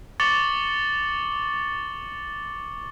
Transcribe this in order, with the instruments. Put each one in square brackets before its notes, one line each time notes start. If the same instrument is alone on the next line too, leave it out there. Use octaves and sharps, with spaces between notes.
[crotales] C#6 D6 A6 C#7 F#7 G7